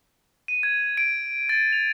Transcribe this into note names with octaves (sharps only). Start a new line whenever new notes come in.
D#7
G#6
D7
A6
F7